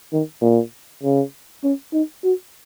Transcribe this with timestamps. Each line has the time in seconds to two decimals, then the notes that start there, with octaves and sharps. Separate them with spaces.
0.13 D#3
0.42 A#2
1.03 C#3
1.64 C#4
1.93 D#4
2.24 F#4